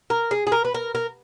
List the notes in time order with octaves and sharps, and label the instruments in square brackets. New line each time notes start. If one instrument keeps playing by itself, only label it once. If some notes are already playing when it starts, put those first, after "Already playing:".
[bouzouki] A#4
G#4
G#4
A#4
B4
A#4
A#4